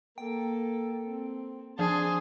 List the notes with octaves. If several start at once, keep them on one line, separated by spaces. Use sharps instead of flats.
A#3 A4 G5
C4
F3 D4 G#4 A5 C6